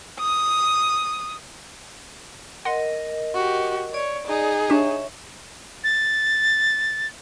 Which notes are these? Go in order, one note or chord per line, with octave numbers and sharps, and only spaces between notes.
D#6
A#4 D#5 F#5 C6
F#4 G4
C#5 D5
D#4 G#4
D4 G4 C#5 E5 C#6
A6